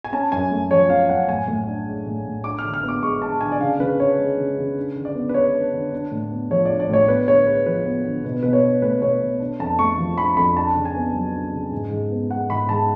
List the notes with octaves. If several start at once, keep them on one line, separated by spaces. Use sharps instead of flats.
G#5
C#4 A5
F#2 G#5
A3
F3 C#5
C#4 F5
F#2 F#5
A2 G#5
A2
D4
G#3
A2
A2
D4 D6
F6
D3
F6
B3
D6
G#3 C#6
D4 A5
D3 G#5
D5
C#3 F5
C#3 B4
D4 C#5
G#3
C#3
C#3
D4
D3
D5
B3
B4
G#3 C#5
D4
D3
D4
A2
B3
F3 C#5
D5
D4
D5
A2 C#5
B3 B4
D3 C#5
G#3 B4
F3 B4
B3
D3
B2 B4
B2 B4
C#5
D4
A3 B4
B2 C#5
B2
D4
F2 A5
A3 C#6
F3
D4 B5
F2 B5
D4 A5
C#3
G#5
B3
F#3
D4
C#3
G#2
G#2
B3
G#3 F#5
G#2 B5
G#2 A5